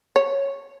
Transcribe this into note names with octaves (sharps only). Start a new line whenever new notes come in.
C#5